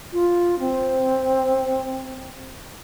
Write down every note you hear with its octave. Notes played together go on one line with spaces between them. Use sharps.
F4
C4